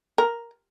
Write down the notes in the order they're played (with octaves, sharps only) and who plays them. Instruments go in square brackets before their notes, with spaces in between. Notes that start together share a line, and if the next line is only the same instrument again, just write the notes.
[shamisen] A#4